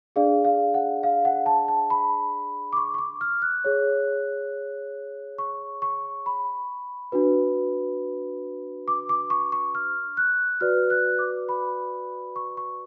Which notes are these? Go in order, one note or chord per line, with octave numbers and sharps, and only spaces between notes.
D4 G#4 D5 F5
F5
F#5
F5
F#5
A5
A5
B5
D6
C#6
C#6
D6
F6
F#6
G#4 C#5
C#6
C#6
B5
D4 F#4 B4
D6
D6
C#6
C#6
F6
F#6
F#4 B4 D5 F6
F#6
D6
B5
C#6
C#6